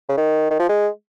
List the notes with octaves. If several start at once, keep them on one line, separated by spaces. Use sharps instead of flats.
C#3
D#3
D#3
F3
G#3